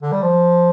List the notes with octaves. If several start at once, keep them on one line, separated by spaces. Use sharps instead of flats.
D3
G3
F3